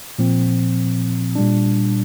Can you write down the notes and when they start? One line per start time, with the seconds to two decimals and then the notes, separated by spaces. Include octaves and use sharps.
0.19 A#2 F3 C4
1.35 A#2 G3 D4